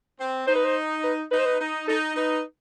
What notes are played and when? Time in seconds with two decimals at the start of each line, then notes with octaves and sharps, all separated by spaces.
0.20 C4
0.47 D#4 C5
0.55 B4
0.64 C5
1.04 B4
1.31 D#4 B4
1.38 C5
1.45 B4
1.60 D#4
1.88 D#4 A4
2.15 D#4 B4